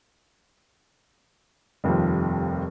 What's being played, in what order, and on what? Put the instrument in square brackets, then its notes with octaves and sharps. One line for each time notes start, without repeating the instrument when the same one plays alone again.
[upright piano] F1 D#2 F3 G3